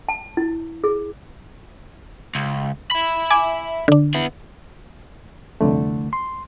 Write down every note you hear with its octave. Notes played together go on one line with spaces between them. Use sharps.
A5
E4
G#4
C#2
E5 B5
G#5 D6
D3 D4
B3 E4
C2 F2 D3 A3
C6